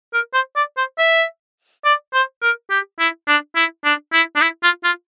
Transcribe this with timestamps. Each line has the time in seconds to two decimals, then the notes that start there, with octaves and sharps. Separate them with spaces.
0.13 A#4
0.34 C5
0.56 D5
0.77 C5
0.98 E5
1.84 D5
2.13 C5
2.42 A#4
2.70 G4
2.99 E4
3.27 D4
3.56 E4
3.84 D4
4.13 E4
4.35 D4
4.41 E4
4.63 F4
4.84 F4